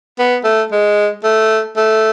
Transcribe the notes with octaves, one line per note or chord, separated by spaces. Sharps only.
B3
A3
G#3
A3
A3